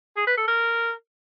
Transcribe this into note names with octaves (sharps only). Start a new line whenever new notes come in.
G#4
B4
A4
A#4